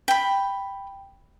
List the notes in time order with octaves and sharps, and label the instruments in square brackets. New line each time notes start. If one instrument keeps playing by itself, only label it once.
[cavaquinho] G5 B5